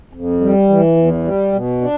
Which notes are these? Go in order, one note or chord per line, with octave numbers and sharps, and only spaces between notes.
F2
G3
E3
E2
G3
B2
D4